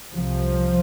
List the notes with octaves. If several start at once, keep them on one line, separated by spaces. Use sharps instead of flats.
C2 C3 F3